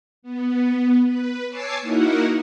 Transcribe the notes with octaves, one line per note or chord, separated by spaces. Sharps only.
B3
B4
C#5 G#5 A5 D6 E6 C7
A#3 D#4 E4 F#4 A#4 F#5